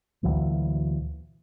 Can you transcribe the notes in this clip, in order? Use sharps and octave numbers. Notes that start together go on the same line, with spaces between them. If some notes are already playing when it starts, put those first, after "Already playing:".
D2 A#2 E3 F#3